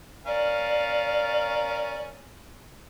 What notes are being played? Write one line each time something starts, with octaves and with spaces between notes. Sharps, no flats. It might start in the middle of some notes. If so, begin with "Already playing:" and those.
C#4 A#4 D5 F5